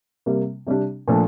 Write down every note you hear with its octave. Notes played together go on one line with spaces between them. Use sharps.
C3 G3 A#3
C3 G3 D4 G4
A#2 F3 A3 D4